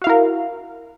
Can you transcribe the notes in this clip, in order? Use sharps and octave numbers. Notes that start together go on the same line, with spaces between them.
E4 F#4 A#4 F5